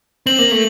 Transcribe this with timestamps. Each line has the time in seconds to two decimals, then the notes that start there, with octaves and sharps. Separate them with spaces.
0.26 C4 F#7
0.39 A#3
0.52 A3